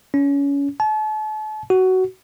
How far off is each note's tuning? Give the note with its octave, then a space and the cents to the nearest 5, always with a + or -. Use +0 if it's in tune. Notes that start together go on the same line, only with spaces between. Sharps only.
C#4 +25
A5 -40
F#4 +15